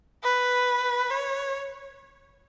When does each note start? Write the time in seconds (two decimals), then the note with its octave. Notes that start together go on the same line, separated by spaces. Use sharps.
0.23 B4
1.10 C#5